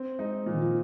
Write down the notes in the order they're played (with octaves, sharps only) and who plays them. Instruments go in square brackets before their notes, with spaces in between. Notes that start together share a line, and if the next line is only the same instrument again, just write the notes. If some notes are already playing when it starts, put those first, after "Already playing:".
Already playing: [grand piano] C4
[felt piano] G#3 [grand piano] D#4
[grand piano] A#2 [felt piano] F3
[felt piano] D#3
F3